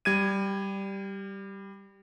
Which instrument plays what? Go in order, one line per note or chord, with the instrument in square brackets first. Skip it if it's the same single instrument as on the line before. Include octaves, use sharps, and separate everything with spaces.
[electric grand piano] G3 G#6 D#7